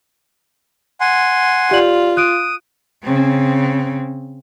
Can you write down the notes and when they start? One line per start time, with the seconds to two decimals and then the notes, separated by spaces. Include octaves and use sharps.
1.00 F#5 G#5 C6
1.71 F4 G4 D5 F#7
2.17 D#6 F#6 D7
3.03 C#3 C4